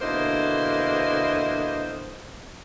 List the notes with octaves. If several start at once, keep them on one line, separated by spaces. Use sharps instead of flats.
B2 D3 A#3 E4 C5 D#5